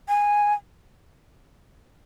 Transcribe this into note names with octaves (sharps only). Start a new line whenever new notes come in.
G#5